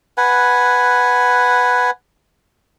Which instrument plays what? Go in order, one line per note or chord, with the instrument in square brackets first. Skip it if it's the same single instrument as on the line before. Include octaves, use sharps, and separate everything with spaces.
[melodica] B4 F#5 G#5